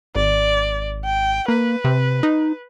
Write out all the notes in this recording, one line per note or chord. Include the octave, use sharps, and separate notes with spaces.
G#1 D5
G5
A#3 B4
C3
D#4